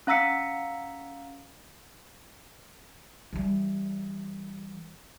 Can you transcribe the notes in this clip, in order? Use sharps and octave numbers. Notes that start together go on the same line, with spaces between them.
C#4 F5 A#5 E6 B6 C#7
E3 G3